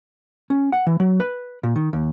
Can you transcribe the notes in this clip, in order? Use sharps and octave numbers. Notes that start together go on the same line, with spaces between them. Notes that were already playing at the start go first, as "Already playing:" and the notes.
C#4
F#5
E3
F#3
B4
A#2
D#3
D#2